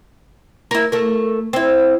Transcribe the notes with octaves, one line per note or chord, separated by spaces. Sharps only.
E4 A#4
A3 A#4
C4 E4